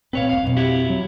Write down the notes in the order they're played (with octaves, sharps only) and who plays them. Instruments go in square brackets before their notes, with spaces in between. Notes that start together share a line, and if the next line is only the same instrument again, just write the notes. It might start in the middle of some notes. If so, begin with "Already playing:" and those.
[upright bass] D2 A#2 [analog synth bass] C4 [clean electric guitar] B4 C#5 F5
[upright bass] F2 A#3 [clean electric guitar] F5
[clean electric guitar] B1 [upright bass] F2 B2
[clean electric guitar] E4 F#4 G4
[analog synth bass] F#3